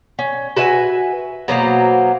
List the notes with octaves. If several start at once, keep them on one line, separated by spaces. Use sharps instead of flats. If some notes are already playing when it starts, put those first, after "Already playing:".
C#4
F#4 B4 E5 G#5
B2 F#3 A#3 C5